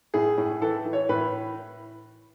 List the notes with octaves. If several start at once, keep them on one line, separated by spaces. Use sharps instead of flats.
A2 G#4
A2
E3 A4
E3
C#5
A2 B4